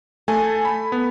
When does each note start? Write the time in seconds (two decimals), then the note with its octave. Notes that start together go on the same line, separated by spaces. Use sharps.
0.28 A3 A4 G#5
0.65 B5
0.92 B3